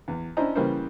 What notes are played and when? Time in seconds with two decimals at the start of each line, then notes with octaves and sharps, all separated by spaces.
0.08 E2
0.37 C#4 D4 E4 C5 D#5 A#5
0.56 C#3 E3 G3 A#3 A#4 C5